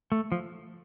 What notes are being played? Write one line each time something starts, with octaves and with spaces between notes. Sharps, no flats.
A3
F3